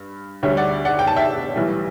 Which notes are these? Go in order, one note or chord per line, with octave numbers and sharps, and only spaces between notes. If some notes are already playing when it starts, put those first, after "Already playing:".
Already playing: G2
D2 D3 G3 C#5 E5
D5 F#5
D5 F#5
G5
A5
E5 G5
B1 A2 E3 G3